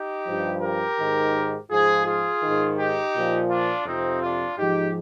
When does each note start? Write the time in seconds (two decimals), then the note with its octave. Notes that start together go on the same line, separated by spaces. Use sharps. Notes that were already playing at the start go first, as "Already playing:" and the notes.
Already playing: D#4 G4
0.27 G2 F3
0.62 G4 A#4
0.99 G#2 D#3
1.70 G#2 F3 F4 G#4
2.06 F4 G#4
2.43 G#2 D#3
2.78 D#4 G4
3.14 A#2 F3
3.50 D4 F4
3.86 F2 C3 F3 C4 D#4
4.23 D4 F4
4.58 G#2 F3 D#4 G4